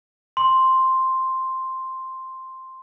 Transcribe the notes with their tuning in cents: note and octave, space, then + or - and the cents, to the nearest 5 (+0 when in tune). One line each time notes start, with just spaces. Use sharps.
C6 +0